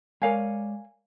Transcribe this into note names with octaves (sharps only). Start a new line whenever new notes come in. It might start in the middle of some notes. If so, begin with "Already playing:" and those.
G#3 A#4 C#5 D5 F5 G#5